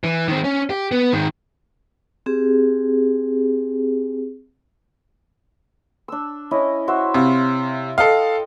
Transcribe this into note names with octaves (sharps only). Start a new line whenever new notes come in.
E3
D#3 C4
C#4
G4
B3
G#2 D#3
C4 G4 G#4
D4 E6
C#4 E4 D#5
F#4 C5 E5
C3 E5 F5
A4 D#5 F5 G5